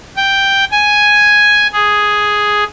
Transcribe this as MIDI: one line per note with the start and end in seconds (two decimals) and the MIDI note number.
0.16 0.65 79
0.71 1.67 80
1.73 2.64 68